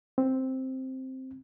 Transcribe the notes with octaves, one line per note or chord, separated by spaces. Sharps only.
C4